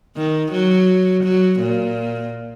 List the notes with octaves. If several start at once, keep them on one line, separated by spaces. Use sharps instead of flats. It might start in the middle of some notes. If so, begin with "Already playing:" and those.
D#3
F#3
F#3
A#2